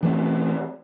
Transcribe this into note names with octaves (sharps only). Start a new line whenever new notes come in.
E3 A3 C4